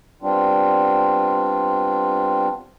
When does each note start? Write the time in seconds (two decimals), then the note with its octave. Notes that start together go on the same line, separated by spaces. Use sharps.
0.22 G3 B3 C4 D4 F4